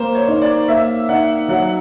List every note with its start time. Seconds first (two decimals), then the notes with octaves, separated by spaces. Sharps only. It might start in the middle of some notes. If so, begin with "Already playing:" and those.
Already playing: A#3 A#4 C5
0.15 C#5
0.28 D#4
0.42 D5
0.68 A#3 E5
1.09 D#4 F#5
1.48 F#3 F#5